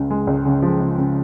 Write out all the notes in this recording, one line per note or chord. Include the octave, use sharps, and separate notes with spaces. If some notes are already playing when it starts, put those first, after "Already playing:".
Already playing: C#2 C#3
G#3
C#2
C#3
F3
C#3
C#3